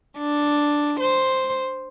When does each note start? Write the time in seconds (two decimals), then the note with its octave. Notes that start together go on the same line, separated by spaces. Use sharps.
0.18 D4
1.00 C5